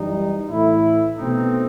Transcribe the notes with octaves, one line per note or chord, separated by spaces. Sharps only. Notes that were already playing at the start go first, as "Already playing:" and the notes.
Already playing: F#2 E3 G3 D#4
A2 E3 A3 E4
B2 A3 C4 D#4